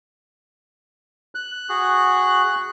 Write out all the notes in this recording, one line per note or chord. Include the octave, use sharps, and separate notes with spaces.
F#6
F#4 G#4